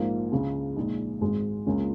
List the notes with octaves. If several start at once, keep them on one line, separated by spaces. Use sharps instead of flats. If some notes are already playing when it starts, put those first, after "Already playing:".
Already playing: A#1 G#2 F3 A#3 D#4
C#2 C#3 G#3
A#1 A#2 G#3 D#4
G#1 G#2 G#3
C#2 C#3 A#3 C#4 F4